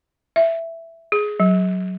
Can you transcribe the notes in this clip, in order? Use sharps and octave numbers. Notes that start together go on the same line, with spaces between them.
E5
G#4
F#3